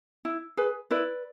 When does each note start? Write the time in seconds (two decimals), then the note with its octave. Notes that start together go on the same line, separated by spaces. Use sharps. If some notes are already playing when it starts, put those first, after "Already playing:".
0.25 E4
0.57 G#4 B4
0.90 E4 B4 D5